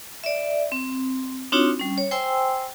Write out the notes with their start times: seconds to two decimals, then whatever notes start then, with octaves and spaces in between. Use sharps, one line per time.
0.24 D5 E5
0.72 C4
1.52 C4 D4 D#4 F4 F#4 C#5
1.80 G3 C#4
1.98 C#5
2.11 C5 G5 G#5 C6 E6